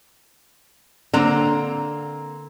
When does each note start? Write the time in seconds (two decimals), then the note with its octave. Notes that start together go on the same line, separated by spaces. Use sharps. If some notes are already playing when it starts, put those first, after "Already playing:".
1.13 D3 A#3 C4 A#5